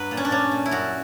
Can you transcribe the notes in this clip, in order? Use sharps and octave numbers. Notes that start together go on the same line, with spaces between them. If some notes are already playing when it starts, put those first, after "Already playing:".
Already playing: G2 F#3 B4
A#2
C#4
D4
A#2 C#4
A#2
E4
F#2 F#4